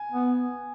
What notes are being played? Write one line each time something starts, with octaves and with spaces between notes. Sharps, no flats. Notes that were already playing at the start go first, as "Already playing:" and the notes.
Already playing: G#5
B3